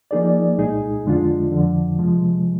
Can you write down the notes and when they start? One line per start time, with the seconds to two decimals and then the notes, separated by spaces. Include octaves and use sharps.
0.11 F3 A#3 D#4 G#4 D5
0.58 C2 A#2 G#3 D#4 G#4
1.05 F2 D3 G#3 D4 F4
1.51 F2 D3 F3
1.99 C3 F3 G#3